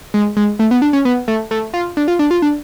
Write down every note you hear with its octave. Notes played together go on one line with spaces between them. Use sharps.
G#3
G#3
A3
B3
D4
C#4
B3
A3
A3
F4
D4
F4
D4
F4
D4